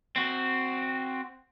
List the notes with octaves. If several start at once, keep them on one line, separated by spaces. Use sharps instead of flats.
C4 F#4